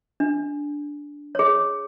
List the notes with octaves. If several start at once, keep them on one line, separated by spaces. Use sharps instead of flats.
D4
G#4 C#5